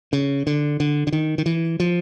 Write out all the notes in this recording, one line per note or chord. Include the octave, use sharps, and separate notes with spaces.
C#3
D3
D3
D3
D#3
D#3
E3
F3